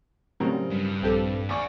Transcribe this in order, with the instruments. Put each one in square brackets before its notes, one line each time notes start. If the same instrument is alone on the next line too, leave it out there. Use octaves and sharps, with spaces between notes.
[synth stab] A2 F#3 C4 [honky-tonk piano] C#3 G3 A#4
[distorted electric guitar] G2
[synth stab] A#1 G4 A4 [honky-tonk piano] C4
[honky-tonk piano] A#1 D5 C#6 [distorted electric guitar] F#5 G#5